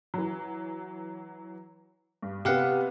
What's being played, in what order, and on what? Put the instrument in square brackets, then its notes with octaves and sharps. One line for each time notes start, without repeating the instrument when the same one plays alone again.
[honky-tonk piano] E3 F#3
G2
[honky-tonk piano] C3 B3 [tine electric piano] G4 F5 F#5